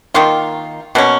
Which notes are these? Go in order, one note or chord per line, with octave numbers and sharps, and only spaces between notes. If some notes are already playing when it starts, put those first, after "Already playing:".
D#3 A#3 F4
B2 A#3 C#4